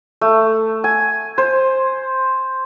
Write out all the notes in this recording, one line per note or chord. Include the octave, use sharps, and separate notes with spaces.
A3
G#5
C5